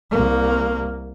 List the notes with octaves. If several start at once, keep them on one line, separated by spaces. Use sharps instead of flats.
C2 A#3